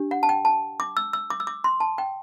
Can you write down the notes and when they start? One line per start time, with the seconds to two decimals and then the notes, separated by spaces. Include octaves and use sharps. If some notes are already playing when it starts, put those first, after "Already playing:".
Already playing: D4 G4
0.11 F#5
0.23 A5
0.29 G5
0.45 A5
0.80 D6
0.97 E6
1.13 E6
1.30 D6
1.40 E6
1.47 D6
1.64 C6
1.80 A5
1.98 G5